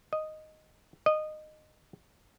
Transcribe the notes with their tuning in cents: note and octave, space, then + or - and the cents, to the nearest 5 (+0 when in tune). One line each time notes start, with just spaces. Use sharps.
D#5 -5
D#5 -20